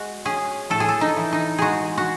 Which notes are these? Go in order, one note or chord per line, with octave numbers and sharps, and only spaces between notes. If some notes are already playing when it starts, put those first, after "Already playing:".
Already playing: G#3 F#4
C#4 G#4
A2 A4
G#4
A4
D#4
E3
D#4
G#3 F#4 G#4
F#4